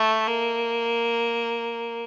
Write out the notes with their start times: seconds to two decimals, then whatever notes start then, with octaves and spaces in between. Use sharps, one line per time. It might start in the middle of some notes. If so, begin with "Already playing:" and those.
Already playing: A3
0.27 A#3